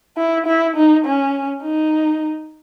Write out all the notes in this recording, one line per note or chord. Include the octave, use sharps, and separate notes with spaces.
E4
E4
D#4
C#4
D#4